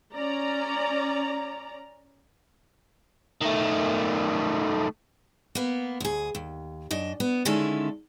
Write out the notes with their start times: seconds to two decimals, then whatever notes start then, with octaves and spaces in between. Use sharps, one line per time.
0.15 C#4 D5 A#5
3.41 D#3 A3
5.55 A#3 B3
6.00 D2 G#4
6.35 D#2
6.91 F#2 D4 D#5
7.20 B3
7.45 D3 D#3 G#3 C#4 E4 A4